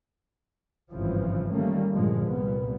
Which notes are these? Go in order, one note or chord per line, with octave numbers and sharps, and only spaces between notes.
G#1 G2 C#3 E3 F3
D#3 G3 A3 A#3 C#4
G2 A#2 D3 F3 G#3
C2 A#2 G3 B3